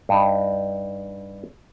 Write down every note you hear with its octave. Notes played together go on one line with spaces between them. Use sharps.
G2 D#4